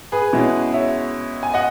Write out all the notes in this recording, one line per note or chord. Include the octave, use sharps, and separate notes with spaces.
G#4 B4
B2 G#3 C#4 E4
C#5 E5
G#5
D#5 F#5